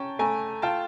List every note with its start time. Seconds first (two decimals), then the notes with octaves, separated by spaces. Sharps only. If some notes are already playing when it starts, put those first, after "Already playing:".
Already playing: C#4 G5 A5 A#5
0.19 A3 G#5 A#5
0.62 F4 G5 A5